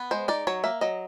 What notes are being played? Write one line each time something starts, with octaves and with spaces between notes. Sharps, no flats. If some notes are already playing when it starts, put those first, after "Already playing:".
Already playing: B3
G#3 C5
D#4 D5
F#3 C#5
A#3 E5
F#3 D#5